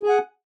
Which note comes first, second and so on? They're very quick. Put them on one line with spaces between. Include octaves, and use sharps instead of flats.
G#4 G#5 F#5